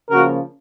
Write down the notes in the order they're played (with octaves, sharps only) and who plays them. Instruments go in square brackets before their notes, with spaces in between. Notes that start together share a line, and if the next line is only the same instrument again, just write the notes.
[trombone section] C#3 F3 A#3 F#4 A#4